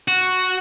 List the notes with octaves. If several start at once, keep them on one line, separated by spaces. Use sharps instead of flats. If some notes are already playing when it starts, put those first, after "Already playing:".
F#4